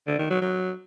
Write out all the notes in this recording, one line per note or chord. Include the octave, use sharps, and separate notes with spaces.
D3
D#3
F#3
F#3